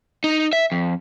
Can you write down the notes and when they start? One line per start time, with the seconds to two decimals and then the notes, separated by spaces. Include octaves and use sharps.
0.24 D#4
0.53 E5
0.72 F2